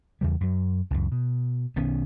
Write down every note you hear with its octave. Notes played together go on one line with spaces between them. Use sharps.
E2 C#3 G3
F#2 F#3
C#2 F#2
B2
B1 D#3 B3 C#4